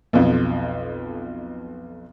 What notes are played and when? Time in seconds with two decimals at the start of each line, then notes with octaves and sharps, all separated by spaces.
0.13 B1 F2